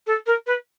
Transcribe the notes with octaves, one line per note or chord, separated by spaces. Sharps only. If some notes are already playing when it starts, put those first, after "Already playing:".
A4
A#4
B4